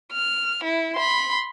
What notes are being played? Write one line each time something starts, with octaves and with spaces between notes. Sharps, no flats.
F6
E4
B5 C6